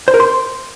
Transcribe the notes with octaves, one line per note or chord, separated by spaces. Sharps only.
C5
A#4
C6